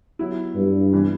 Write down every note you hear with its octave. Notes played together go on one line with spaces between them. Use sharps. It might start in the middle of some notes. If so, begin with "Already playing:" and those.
F#3 B3 E4
G2
C3 E3 G3 B3